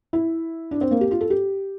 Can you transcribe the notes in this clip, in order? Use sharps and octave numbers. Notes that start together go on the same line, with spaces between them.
E4
D4
C4
A#3
G4
F4
A4
G4